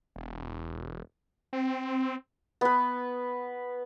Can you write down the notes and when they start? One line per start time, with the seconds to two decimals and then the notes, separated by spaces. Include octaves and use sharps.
0.16 E1
1.53 C4
2.61 B3 B4